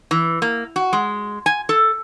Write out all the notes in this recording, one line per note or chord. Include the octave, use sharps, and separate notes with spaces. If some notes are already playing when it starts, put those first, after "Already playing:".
E3
A#3
F#4
G#3
G#5
A4